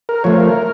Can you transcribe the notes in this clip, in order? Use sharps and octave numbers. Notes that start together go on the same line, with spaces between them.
A#4
F3 A3 C#5
A#4